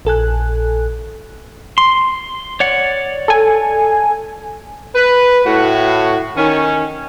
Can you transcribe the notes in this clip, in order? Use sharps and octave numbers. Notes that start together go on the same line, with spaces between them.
A#1 A4 G#5 F#6
C6
C#5 D5 F#5
A4 G#5
B4
A2 F#4
D#3 C#4